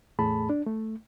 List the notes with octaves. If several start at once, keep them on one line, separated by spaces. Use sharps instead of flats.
E2 A2 A3 G#4 A5 B5
D4
A3